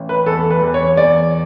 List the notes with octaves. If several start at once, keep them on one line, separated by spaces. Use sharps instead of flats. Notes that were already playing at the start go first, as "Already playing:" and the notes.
Already playing: A1
B4
E2 A4
B4
E2
C#5
E2 D5